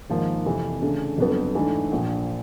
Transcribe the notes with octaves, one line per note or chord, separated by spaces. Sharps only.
G#1 G#2 F3 A#3
F2 C3 E3
C#3 E3 A3 D4
G1 F2 D3 F#3 B3
G#2 E3 A3 D4
A#1 A#2 F3